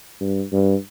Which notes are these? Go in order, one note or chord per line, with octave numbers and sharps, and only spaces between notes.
G2
G2